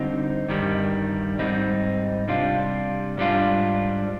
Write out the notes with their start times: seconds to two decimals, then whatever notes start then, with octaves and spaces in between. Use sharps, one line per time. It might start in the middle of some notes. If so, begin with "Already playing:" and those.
Already playing: D3 G3 C4 D#4
0.48 G2 D#3 G3
1.39 G#2 G3 C4 D#4
2.28 C3 G3 D4 F4
3.17 G#2 G3 D4 F4